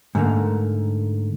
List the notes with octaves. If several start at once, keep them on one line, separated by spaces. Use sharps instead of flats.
G#2 D3 A3 A#3